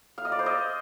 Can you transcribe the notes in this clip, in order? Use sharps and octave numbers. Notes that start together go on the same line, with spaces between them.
F5
D#5
D5
C5
D#5